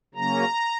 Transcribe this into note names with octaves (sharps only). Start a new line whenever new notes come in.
C#3 F#3 A#3 C#4 A#5